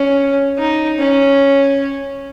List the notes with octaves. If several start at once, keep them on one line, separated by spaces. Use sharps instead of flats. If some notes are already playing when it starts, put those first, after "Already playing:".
Already playing: C#4
D#4
C#4